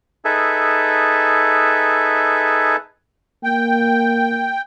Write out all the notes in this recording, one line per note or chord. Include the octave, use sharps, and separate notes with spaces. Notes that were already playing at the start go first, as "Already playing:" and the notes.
D#4 G#4 A4 B4 E5
A#3 G5